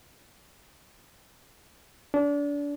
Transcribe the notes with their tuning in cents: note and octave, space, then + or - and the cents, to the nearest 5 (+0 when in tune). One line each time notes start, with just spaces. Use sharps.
D4 -30